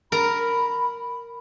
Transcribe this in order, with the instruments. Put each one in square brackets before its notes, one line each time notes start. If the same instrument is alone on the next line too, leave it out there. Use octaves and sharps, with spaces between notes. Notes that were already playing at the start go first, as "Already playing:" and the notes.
[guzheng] A#4 A#5 [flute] B5